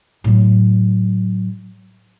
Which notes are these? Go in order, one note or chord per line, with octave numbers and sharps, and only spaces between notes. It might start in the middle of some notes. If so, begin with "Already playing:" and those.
A2 F#3